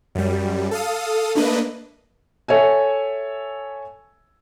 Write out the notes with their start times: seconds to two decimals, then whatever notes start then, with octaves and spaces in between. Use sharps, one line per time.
0.15 F#2 G3
0.71 A4 F5 D#6
1.35 A3 A#3 D4 B4 D#5
2.48 A4 C#5 E5 G#5